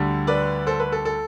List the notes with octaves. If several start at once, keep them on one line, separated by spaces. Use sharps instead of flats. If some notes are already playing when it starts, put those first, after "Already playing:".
Already playing: D2 D3 G3
B4 D5
A4 C5
B4
A4
A4